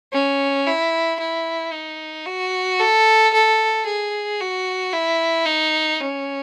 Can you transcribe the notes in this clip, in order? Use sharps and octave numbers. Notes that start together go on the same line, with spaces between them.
C#4
E4
E4
D#4
F#4
A4
A4
G#4
F#4
E4
D#4
C#4